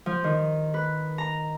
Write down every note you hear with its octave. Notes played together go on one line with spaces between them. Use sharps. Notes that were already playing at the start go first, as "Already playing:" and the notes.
F3
D#3
B4
A#5